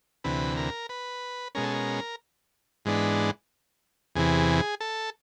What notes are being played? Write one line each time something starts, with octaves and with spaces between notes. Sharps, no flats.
D2 C3 E3 B4
A#4
B4
B2 G#3 C#4 A#4
A4
A#4
G#2 E3 G#3 B3 D4
E2 C3 E3 G#4
A4